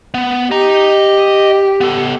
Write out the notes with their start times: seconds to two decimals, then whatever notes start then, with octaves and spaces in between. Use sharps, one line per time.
0.14 B3
0.51 G4 D#5 A#5
1.81 B3 A4